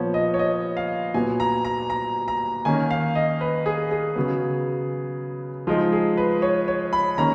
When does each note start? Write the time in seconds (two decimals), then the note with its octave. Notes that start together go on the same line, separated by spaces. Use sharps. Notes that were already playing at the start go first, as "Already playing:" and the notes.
Already playing: A#2 F3 B3 C#5
0.14 D#5
0.34 C#5
0.39 D#5
0.77 F5
1.14 A#2 F#3 B3 G#5
1.40 A#5
1.65 A#5
1.90 A#5
2.28 A#5
2.65 D#3 A#3 C#4 G#5
2.91 F5
3.15 D#5
3.41 B4
3.66 G#4
3.91 G#4
4.16 C#3 F#3 B3
5.67 F3 G#3 D#4 F4
5.92 G#4
6.17 B4
6.42 C#5
6.68 C#5
6.93 B5
7.18 D#3 A#3 C#4 A#5